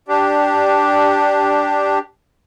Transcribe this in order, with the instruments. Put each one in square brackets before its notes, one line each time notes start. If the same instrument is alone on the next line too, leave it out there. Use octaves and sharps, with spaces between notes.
[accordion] D4 G4